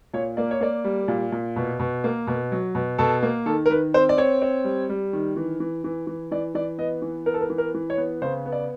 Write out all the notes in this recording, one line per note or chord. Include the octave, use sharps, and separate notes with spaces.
A#2 C#5
A#3 D5
C#5
A#3 D5
G3
A#2
A#2
B2
B2
A#3
B2
F#3
B2
B2 A4
A#3
D#3 A4
A#4
D#3 B4
C4 C5
D5
C4 C#5
C4
G3
G3
D#3
E3
E3
E3
E3
E3 D5
E3 D5
B3 D#5
E3
B3 A#4
A4
A#4
E3
A#4
E3
C#5
B3
C#3 C5
B3
D5